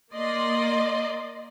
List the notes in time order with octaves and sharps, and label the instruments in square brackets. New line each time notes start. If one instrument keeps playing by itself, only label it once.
[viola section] A#3 D5 D#5 C6